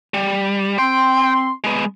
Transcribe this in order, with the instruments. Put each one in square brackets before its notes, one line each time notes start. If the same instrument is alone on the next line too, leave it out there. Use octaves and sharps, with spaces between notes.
[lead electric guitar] G3
[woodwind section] C4 C6 [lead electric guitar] G5
[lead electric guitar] G#3 B3